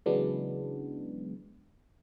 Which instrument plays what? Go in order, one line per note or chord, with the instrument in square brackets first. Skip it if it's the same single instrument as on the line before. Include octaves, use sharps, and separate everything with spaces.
[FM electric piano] C#3 E3 F#3 G#3 B3 D4